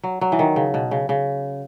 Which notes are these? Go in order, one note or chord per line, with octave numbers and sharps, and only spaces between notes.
F#3
F#3
E3
D#3
C#3
B2
C#3
C#3